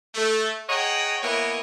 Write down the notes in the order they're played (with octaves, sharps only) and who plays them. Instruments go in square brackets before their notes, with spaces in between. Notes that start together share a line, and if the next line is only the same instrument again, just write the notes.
[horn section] A3
G#4 C#5 D#5 F#5 G5 A#5
A#3 B3 E4 C#5 D#5 G#5